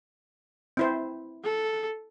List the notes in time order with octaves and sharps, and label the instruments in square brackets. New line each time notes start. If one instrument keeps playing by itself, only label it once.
[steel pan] C4 E4 C5
[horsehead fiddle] A4